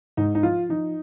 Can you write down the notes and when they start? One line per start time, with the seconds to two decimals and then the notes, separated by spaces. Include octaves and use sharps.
0.17 G#2 D#4
0.35 D#4
0.43 F3 F4
0.69 F3 D#4